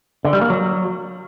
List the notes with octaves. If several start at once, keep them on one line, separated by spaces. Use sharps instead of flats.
D3
G3
A#3
F#3